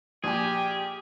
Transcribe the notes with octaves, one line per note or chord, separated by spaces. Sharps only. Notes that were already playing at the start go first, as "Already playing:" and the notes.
A#1 G4 G#4 G#5